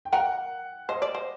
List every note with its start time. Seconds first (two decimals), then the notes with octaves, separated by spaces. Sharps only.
0.05 G5
0.13 A#4 F#5
0.89 C5 D#5
1.02 D5
1.15 C5